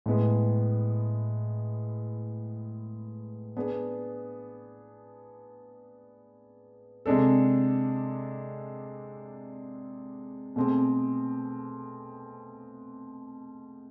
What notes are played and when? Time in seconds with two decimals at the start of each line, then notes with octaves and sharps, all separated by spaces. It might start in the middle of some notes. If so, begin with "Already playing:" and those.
0.06 A2 G#3 B3
3.57 B3 D4 G#4
7.06 C3 G#3 D4 A4
10.56 B2 A3 C4 G#4